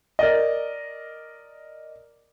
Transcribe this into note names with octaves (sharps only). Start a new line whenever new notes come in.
A#4 D5 D#5